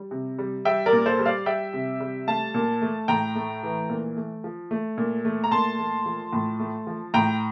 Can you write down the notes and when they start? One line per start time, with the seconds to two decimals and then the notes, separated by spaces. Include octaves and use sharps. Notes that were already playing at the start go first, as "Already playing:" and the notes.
Already playing: G3
0.11 C3
0.39 G3
0.65 G3 E5 G5
0.86 A#4 D5
0.93 A#2
1.06 A4 C5
1.19 G3
1.26 D5 F5
1.46 G3 E5 G5
1.73 C3
2.00 G3
2.27 A3 F5 A5
2.54 A#2
2.82 A3
3.08 A2 G5 A#5
3.35 A3
3.63 E3
3.89 A#2
4.17 A3
4.44 F3
4.71 A3
4.98 A#2
5.25 A3
5.44 A#5
5.51 A#2 A5 C6
5.79 A3
6.06 F3
6.33 A2
6.60 A3
6.87 F3
7.14 A2 G5 A#5